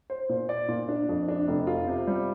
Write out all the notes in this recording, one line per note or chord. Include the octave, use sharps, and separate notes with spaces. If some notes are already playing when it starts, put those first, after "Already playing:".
C5
A#2
D5
A#2
D4
F2
D4
F1
F4
C3
G3